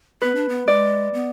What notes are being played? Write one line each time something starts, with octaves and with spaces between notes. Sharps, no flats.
B3 B4
D4
B3
G#3 D5
B3